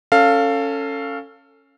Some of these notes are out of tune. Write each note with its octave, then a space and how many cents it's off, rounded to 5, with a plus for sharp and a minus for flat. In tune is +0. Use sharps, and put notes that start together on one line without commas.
C#4 +0 A4 +20 F5 +0